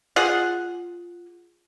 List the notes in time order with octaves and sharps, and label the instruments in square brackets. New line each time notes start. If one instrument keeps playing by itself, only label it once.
[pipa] F4 G#4 F#5